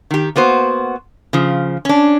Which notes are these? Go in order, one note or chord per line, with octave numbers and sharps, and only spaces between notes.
D#3 G4
A#3 B3 F#4 C5
C#3 F3
C#4 D4